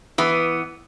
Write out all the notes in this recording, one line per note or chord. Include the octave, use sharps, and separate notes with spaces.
E3 B3